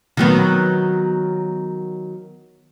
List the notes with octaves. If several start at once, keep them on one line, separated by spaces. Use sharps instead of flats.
D#3 F#3 B3